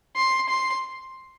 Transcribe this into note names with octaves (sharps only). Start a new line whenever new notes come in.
C6
C6